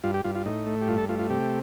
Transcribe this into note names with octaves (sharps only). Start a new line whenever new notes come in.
G2 F4
G4
G2 F4
F4
A2 D#4
A3
G4
G2 F4
A4
A3 F4
F4
C3 G4